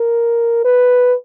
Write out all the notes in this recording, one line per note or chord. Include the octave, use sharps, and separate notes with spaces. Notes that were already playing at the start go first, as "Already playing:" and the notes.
Already playing: A#4
B4